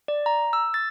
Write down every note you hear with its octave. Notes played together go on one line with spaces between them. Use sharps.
D5
A#5
E6
A6